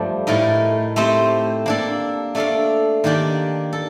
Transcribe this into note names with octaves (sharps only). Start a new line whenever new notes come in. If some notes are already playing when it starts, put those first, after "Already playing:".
Already playing: G2 F3 A3 D4 G4
A2 A3 D#4 A#4
A3 C4 G4 C5 D#5
A#3 D4 A4
A3 D4 A4 D5 F5
D#3 A#3 D4 G4 D5
A4